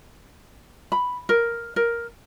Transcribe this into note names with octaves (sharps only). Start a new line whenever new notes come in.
B5
A#4
A#4